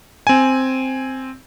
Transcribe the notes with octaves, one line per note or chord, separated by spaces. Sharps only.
C4 G#5